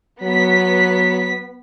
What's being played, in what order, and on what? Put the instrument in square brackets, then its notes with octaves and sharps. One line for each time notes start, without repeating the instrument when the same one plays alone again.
[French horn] F#3 [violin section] B3 B6